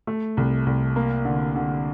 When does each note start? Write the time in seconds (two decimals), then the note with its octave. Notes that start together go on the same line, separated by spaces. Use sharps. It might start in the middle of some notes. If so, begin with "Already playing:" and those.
0.07 A3
0.37 C2
0.66 C2
0.96 A#3
1.25 D3
1.55 D3